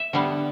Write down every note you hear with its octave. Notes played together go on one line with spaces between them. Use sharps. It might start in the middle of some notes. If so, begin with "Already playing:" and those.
Already playing: E5
D3 G3 B3